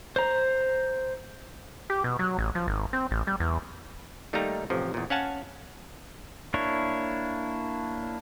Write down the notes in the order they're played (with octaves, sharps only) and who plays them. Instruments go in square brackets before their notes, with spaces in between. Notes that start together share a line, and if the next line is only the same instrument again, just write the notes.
[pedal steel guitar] C5 A#5
[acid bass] G4
B2
F#3
A1
F3
G#1
C4
A1
G3
E2
[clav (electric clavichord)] D#3 G3 A3 A#3 D#4 A#5
A1 C3 F3
E2 A#2
C#4 F5 F#5 G#5 A5
[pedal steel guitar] A#3 D4 E4 C#5